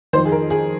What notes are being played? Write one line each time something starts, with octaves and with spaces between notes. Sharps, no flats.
F2 D#3 C5
G#4
A#4
G#4